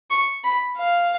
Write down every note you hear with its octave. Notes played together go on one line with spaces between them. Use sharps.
C#6
B5
F5